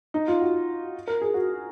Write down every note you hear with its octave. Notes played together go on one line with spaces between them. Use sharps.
D#4
F4
F#4
A#4
G#4
F#4